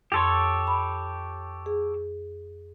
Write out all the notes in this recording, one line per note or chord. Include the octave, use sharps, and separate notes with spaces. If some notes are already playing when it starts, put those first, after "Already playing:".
F2 G4 A4 C#5 C6
B5
G#4